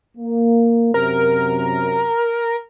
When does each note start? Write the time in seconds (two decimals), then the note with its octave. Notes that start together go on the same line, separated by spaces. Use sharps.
0.18 A#3
0.94 F#2 C3 A#4